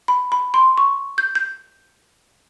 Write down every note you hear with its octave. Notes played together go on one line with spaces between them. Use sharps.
B5
B5
C6
C#6
G6
G6